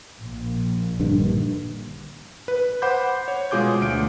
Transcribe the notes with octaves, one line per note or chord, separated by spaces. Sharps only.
A#1 A#2
G2 D3 D#3
B4
C5 F#5 B5 D6 G6
C#5
B2 G#3 F4 G#4 D6 G6
D2 D7